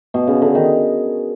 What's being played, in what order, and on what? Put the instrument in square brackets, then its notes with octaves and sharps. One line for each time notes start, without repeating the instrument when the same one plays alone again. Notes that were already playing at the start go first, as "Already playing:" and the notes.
[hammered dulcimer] B2
C#3
D3
D#3